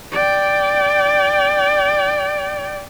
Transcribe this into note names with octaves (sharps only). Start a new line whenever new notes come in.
D5 G5